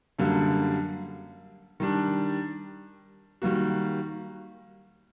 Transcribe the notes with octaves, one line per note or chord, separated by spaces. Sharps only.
F#2 D3 G3 A#3
D#3 G3 D4
D#3 G3 A#3 F#4